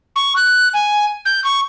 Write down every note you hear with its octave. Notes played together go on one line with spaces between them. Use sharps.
C#6
F#6
G#5
G6
C#6